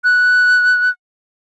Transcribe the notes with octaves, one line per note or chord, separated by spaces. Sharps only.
F#6